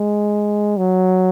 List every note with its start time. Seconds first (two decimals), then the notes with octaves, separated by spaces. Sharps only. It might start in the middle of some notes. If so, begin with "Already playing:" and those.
Already playing: G#3
0.77 F#3